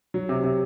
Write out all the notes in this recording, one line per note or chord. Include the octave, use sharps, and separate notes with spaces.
F#3
C3
C3